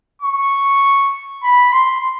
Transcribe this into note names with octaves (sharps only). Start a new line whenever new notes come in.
C#6
B5
C6